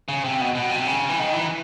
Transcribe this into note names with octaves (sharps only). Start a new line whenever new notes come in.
C#3
C3
B2
B2
C3
C#3
E3
D#3
E3